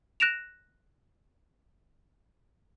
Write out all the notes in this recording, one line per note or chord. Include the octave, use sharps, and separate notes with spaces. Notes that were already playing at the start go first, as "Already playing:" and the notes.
F#6 A#6 D7 E7 F7